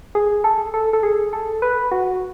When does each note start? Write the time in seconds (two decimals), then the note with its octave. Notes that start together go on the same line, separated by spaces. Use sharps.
0.15 G#4
0.44 A4
0.74 A4
0.93 A4
1.03 G#4
1.33 A4
1.62 B4
1.91 F#4